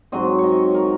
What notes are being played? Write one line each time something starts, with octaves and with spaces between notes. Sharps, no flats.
G#2 F#3 C4 D#5
C#5 D#5
A#4